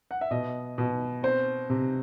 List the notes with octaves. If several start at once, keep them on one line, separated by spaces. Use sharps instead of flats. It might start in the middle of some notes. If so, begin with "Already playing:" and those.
F#5
E5
B2 D#5
B2
C4 C5
C3